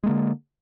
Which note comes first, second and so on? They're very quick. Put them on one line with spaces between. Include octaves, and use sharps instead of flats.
G#3 A#3 D3